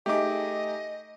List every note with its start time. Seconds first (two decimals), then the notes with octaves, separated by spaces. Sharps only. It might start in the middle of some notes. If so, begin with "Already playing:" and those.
0.06 A3 D#4 G4 G#4 D#5 D6